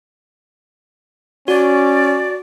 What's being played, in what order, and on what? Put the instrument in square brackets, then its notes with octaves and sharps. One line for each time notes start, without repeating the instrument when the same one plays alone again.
[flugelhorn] C#4 [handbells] F#4 [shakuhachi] D5